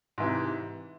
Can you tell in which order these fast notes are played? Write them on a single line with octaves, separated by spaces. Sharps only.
G#2 E3 C3